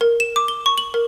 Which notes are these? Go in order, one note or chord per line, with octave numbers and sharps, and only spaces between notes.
A#4
E7
D6
G7
C#6
F#7
A#4